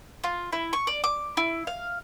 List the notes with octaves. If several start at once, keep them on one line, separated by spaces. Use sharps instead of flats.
F4
E4
C#6
D5
D6
E4
F5